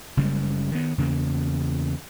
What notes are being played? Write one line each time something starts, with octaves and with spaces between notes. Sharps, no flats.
F#1 C#3 G3 G#3
D#3 B3
E2 C#3 A#3